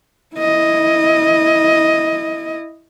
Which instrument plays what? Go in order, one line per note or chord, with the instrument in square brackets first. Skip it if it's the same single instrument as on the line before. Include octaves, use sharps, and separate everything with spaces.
[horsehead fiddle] E4 D#5